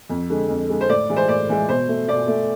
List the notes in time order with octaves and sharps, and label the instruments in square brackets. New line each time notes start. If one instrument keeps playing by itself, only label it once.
[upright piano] F2
D3 G#3
F2
D3 G#3
C5
A2 D5
E3 G#3
C5
A2 D5
E3 G#3
B2 C5
A3
B2 D5
A3